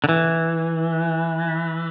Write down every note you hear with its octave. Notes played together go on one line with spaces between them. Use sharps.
D3
E3